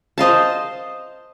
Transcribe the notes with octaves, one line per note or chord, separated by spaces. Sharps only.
C5 D#5 F5 A5